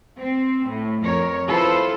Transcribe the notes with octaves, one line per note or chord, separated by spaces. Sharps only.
C4
A2
F2 A#4 C#5
E4 F4 A4 B4 C5